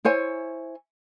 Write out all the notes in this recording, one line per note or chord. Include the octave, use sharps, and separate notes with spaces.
E4 C5 C#5 G#5